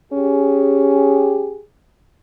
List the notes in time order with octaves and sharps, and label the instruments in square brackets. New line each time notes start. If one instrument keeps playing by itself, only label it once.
[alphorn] C#4 [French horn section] G4 G#4